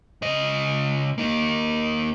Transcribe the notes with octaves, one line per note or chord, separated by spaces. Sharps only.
C#3 D#5
A#3 D#4